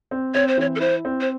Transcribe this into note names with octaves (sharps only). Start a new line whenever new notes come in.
C4
C4 C#5
C5
E3 C#5
A4
E4 C5
C4
C5